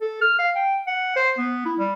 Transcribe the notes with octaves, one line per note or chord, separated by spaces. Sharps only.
A4
F6
F5
G5
F#5
C5
B3
E4
G3